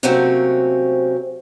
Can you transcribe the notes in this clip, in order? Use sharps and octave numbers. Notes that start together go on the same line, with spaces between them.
C3 F#3 A3 A#3 C4 C#4